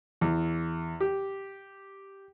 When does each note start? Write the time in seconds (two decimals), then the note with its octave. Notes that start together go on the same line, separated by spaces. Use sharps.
0.21 E2
1.00 G4